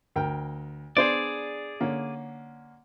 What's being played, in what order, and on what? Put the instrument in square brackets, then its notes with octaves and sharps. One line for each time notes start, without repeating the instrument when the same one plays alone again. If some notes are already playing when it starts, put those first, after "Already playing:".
[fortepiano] D2 A#4 G5
[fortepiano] B3 D4 C5 [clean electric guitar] G#4 D5
[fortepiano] D3 A#3 C#4